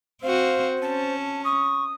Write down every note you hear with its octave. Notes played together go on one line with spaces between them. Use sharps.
C4 F#4 C5 F5
C#4 A5
C#6 D#6